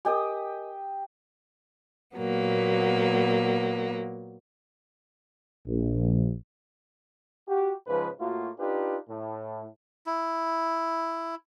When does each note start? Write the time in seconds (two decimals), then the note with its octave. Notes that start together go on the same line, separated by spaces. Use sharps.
0.05 G4 A#4 D#5 G5 G#5 D#6
2.16 A#2 F#3 A#3 B3
5.67 A#1
7.48 F#4 G4
7.87 G#2 C#3 F3 B4
8.19 A2 A#3 F4 F#4
8.59 D4 D#4 F4 G4 B4
9.09 A2
10.06 E4